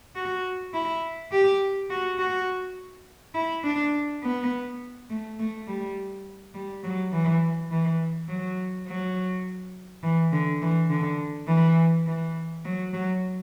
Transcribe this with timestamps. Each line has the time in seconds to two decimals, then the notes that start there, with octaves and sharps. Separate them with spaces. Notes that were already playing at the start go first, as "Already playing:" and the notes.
0.16 F#4
0.73 E4
1.32 G4
1.90 F#4
2.19 F#4
3.35 E4
3.64 D4
4.23 B3
5.10 A3
5.39 A3
5.68 G3
6.54 G3
6.84 F#3
7.13 E3
7.71 E3
8.29 F#3
8.87 F#3
10.03 E3
10.32 D3
10.62 E3
10.90 D3
11.48 E3
12.07 E3
12.65 F#3
12.94 F#3